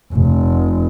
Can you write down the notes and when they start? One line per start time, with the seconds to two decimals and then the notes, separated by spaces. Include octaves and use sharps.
0.13 F1